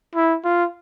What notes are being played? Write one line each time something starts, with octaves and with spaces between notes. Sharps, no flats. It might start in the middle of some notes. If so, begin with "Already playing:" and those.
E4
F4